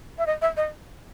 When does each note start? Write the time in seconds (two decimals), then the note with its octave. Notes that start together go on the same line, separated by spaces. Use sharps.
0.18 E5
0.26 D#5
0.42 E5
0.57 D#5